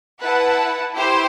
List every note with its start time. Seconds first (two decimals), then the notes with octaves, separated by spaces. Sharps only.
0.23 E4 B4 F#5 A5
0.95 E4 G4 C5